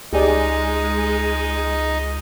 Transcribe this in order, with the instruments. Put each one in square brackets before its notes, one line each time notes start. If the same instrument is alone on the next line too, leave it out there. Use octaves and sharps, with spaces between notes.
[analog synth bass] C#2 [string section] G#3 [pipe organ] D#4 [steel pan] G4 G#4 D5